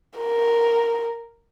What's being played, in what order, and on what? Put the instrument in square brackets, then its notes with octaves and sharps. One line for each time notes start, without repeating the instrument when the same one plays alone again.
[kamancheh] A#4